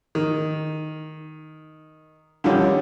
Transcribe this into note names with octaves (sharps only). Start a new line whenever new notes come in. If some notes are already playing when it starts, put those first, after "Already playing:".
D#3
D3 D#3 F3 G3 C#4